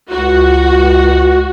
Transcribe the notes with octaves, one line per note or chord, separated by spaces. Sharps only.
C#2 F#4